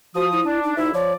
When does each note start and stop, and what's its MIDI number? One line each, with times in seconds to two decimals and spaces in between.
0.15 0.40 53
0.15 0.29 66
0.15 0.40 87
0.32 0.60 64
0.46 0.75 62
0.63 0.75 63
0.77 0.90 38
0.77 0.91 63
0.77 0.90 64
0.77 0.90 76
0.94 1.13 53
0.94 1.13 73
0.94 1.13 74